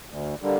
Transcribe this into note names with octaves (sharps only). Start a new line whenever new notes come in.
D2
D3 G3 A#3